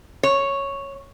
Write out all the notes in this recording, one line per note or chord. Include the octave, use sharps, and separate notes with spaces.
C#5